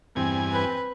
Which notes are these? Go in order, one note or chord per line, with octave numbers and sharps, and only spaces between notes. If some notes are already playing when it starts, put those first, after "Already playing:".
E2 G2 C4 G#5
B4